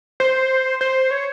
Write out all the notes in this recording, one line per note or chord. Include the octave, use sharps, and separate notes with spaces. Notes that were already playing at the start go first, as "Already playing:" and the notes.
C5
C5
C#5